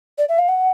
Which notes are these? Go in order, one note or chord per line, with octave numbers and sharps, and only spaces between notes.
D5
E5
F5
F#5